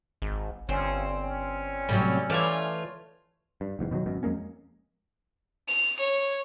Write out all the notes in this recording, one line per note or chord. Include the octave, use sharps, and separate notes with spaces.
G#1
G1 C4 C#4
C#4
A2 C3 F#3 G3
E3 A3 F4 C#5 D5
G2
F#1 E2 G#2
B2 D#3 F3 F#3
G#1 F#2 B2
F2 G#3 A#3 C#4
F7
C#5